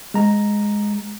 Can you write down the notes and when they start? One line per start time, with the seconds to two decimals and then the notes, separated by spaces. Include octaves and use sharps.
0.14 G#3 A#5